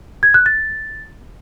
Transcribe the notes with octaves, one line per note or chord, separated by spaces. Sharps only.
G#6
F#6
A6